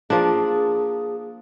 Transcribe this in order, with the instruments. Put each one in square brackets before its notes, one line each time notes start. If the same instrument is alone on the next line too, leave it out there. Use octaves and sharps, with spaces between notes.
[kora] F3 A#3 D4 [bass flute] G#4